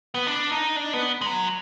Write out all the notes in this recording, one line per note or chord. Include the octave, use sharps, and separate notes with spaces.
B3
D4
D#4
D4
B3
G#3
F#3